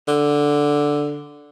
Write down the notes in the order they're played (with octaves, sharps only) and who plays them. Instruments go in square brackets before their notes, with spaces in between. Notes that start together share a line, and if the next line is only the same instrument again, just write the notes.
[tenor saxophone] D3